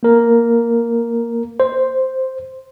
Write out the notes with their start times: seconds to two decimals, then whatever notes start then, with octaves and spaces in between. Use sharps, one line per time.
0.03 A#3 A#4
1.60 C5